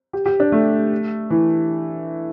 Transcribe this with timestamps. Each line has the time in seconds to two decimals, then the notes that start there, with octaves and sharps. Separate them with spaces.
0.13 G4
0.26 G4
0.40 D4
0.52 A3
1.30 E3